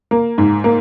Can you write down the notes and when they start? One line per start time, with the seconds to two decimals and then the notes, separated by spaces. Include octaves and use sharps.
0.11 A#3
0.38 G#2
0.64 A#3